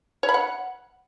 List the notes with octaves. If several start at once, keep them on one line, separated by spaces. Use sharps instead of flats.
C#5
B5
F#5